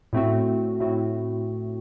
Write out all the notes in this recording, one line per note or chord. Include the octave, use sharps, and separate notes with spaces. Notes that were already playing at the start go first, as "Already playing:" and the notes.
A2 A3 C4 F#4
A2 A3 C4 F#4